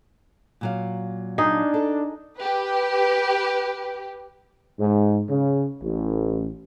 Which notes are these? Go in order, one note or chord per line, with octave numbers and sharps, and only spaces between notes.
A#2 F#3 F5
D4 D#4 G#4
A4
G4 B4
G#2
C#3
A1